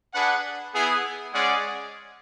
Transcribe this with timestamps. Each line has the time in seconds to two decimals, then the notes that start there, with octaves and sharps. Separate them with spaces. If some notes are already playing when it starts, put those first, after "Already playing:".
0.13 D4 G#4 B4 F#5
0.73 B3 E4 G#4
1.33 G#3 C#4 G#4 D5 F#5